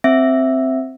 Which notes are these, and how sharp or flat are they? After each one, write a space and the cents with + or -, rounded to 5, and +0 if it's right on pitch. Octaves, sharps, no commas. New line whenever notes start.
C4 +0 E5 +0